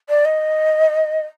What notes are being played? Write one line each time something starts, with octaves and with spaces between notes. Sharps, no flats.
D5
D#5